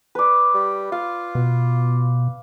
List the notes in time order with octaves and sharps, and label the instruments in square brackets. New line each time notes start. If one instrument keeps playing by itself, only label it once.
[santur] B4 D5
[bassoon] G3
[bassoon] F4 [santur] F5
[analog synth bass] B2